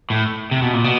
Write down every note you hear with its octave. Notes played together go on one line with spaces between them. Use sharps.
A2
C3
B2
A#2
B2